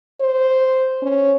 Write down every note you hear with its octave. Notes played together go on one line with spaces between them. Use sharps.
C5
C#4